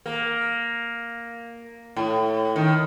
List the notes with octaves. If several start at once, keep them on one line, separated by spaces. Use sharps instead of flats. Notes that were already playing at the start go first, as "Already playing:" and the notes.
A#3
A2
D#3